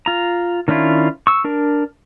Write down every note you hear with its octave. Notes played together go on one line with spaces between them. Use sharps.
F4 A#5
D#3 C#4 D4 E4 F4
C#6 E6
D4 A#4